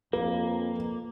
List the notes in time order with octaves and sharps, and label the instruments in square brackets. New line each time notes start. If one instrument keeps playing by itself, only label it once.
[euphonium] F2 [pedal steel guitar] A#3 [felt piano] B4